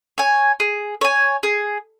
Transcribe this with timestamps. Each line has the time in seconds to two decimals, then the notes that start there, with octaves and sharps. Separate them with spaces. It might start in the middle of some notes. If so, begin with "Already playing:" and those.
0.18 C#5 G#5
0.60 G#4
1.01 C#5 G#5
1.43 G#4